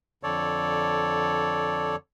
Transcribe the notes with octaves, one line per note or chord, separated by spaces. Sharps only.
F2 D3 A4 C#5 D5